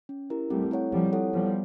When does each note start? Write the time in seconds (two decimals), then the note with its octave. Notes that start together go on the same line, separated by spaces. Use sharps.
0.09 C#4
0.30 E4 G4 A#4
0.50 G3 A3 C4
0.71 E4 A4 C#5 F#5
0.92 F3 G3 C4
1.13 E4 A4 C#5 F#5
1.33 F3 G3 B3